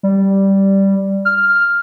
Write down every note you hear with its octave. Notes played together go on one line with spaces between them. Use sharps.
G3
F6